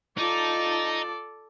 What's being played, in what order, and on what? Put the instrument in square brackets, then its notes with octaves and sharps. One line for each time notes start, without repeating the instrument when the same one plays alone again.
[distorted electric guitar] D#4 [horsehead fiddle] F4 A5 [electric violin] A4 D5